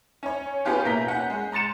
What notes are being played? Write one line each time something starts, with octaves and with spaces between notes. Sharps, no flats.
C#4 C#5
B3 C#4 F4 G4 G#4
B2 A#3 E4 A#5 G6 B6
C#4 F#5
G#3
A#5 C6 A6 C#7 E7